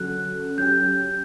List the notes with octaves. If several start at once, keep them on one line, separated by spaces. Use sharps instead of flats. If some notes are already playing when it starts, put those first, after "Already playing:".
Already playing: D3 F#3 C#4 F#4 A4 F#6
F#3 C#4 G4 G6